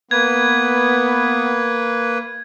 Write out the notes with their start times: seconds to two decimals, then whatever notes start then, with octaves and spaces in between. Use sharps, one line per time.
0.11 A#3 B3 B4 G#6